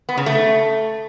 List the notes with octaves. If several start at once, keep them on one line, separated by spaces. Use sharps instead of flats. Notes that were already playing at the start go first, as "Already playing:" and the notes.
B3
C#3
A3